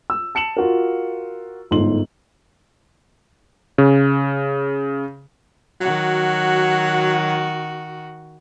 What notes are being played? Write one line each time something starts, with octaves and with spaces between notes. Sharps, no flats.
E6
A5 C#7 E7 F#7
F4 F#4 A#4
G1 G#2 A3 C6 F#7
C#3
D#3 F#3 F#4